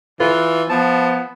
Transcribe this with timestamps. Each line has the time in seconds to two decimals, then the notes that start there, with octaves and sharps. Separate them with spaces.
0.20 E3 F4 B4
0.70 F3 B3 A5